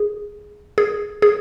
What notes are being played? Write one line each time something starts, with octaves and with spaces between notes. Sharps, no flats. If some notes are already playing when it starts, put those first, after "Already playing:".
Already playing: G#4
G#4
G#4